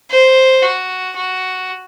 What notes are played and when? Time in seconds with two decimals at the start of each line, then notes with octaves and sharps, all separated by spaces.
0.11 C5
0.63 F#4
1.16 F#4